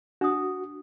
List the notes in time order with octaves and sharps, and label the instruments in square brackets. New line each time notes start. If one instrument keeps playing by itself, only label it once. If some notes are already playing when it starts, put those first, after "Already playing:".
[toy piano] D4 D#6 [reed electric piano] F#4